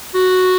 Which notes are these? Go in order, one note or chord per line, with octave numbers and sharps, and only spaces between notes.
F#4